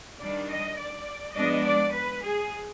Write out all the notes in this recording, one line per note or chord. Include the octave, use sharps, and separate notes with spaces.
D#3 G3 D4 D5
D#5
D5
F3 G#3 B3 D4 D#5
D5
B4
G#4